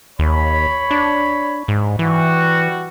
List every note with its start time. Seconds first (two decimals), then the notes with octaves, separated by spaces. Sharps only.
0.19 D#2 C#5 B5
0.91 D4
1.68 G#2
1.99 E3 G3 F#4